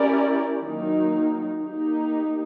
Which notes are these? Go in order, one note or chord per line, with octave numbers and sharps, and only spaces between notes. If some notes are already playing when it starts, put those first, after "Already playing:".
Already playing: C#4 E4 G4 A#4 D5
D#3 F#3 A#3 D#4
A#3 D#4 G4